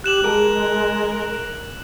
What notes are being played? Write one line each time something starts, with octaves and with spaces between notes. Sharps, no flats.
G4 F#6 E7 F#7
G#3 G#4 A#4 A5